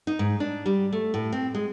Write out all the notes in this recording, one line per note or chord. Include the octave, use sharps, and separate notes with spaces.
D#4
G#2
D4
G3
A3
A2
C4
G#3